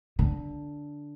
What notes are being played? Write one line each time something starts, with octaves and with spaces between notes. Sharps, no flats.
D3